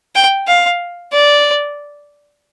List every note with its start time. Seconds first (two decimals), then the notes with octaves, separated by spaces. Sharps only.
0.15 G5
0.48 F5
1.13 D5